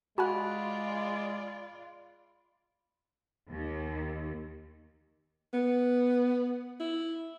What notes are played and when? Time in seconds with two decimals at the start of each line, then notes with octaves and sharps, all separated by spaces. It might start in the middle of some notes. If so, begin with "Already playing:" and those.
0.18 G#3 F4 F#4 D5 F#5 G#5 B5 F#6
3.49 D#2
5.53 B3
6.80 E4